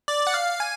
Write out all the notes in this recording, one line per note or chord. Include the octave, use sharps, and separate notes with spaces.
D5
F#5
F5
G#5